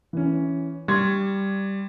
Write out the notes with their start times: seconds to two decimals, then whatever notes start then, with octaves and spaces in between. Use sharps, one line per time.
0.13 E3 C#4
0.88 G3 C6 C#6 G#6